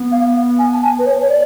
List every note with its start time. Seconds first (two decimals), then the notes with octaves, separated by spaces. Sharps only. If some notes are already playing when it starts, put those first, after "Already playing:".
Already playing: B3
0.12 F5
0.59 G#5
0.73 A5
0.83 G#5
0.99 B4
1.06 C#5
1.22 C#5
1.30 D5